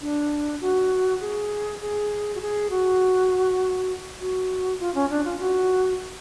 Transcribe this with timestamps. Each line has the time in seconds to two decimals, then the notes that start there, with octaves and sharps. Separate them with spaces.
0.02 D4
0.61 F#4
1.21 G#4
1.81 G#4
2.35 F#4
2.41 G#4
2.70 F#4
4.20 F#4
4.80 F4
4.95 C#4
5.10 D4
5.25 F4
5.39 F#4